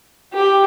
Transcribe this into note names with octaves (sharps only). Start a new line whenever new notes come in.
G4